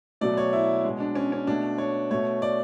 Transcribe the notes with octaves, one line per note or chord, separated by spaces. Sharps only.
B2 F#3 A3 D5
C#5
E4
B2 G#3
D4
C#4
C#4
B2 A3 D4
C#5
B2 A3 C#5
D5